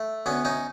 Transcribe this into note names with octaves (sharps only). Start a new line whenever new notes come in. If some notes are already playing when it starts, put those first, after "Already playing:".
Already playing: A3
D2 B3 C#4
C#4 D#4